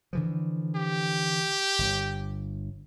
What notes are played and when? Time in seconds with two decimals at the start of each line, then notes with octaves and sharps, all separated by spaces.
0.13 D3 E3 F3
0.76 G4
1.79 G1